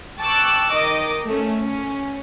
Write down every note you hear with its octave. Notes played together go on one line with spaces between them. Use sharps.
G5 A5 C#6 D6 E6 F#6
D#3 D#5 D6
A3 C#4
C#4